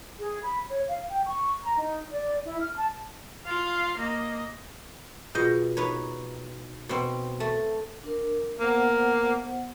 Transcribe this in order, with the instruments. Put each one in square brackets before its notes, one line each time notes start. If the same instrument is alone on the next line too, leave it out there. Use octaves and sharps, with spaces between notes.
[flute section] G#4
B5
C#5
F5
G5
C#6
A#5
D#4
D5
E4
F6
A5
[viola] F4 F5
A#3 D#5
[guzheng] B2 D#5 [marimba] F4 G#4 G6
[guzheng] D#4 B4 C#5
B2 C4
A3
[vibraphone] D4 A#4
[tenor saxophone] A#3 [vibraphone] B3 C5 F#5